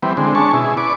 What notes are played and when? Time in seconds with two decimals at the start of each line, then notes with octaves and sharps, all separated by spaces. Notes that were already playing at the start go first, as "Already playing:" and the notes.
0.03 E3 G3 B3 C4
0.17 D3 G#3 C4
0.35 G#3 C#4 D4 A5 C#6
0.53 B2 E4 G#4
0.77 B4 D5 C#6 D6